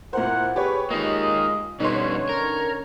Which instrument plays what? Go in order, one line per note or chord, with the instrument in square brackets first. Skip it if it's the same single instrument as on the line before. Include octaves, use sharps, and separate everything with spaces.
[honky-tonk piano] A#2 C5 [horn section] E4 A#4 F#5
[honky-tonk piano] G4 C#5 [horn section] G#4 B4
[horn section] G#3 F4 D#5 [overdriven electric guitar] A#3 D#4
[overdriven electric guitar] B2 G3 [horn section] D3 C#4 C#5 [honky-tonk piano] D#4 B4 C6
[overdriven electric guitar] A#4